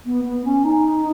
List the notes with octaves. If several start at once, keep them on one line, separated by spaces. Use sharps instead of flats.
B3
B3
C#4
D#4